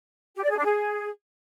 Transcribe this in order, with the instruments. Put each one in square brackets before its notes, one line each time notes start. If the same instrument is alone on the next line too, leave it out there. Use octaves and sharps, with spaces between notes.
[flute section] G4
D5
G#4
D4
G#4